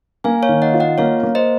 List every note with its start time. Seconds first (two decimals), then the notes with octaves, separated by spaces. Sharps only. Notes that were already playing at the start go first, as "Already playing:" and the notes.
0.24 A#3 F5 G#5
0.43 C#5 F5
0.49 D#3
0.62 D#5 F#5
0.74 F4
0.80 D#5 F#5
0.98 A#3 C#5 F5
1.23 A#3
1.35 C5 D#5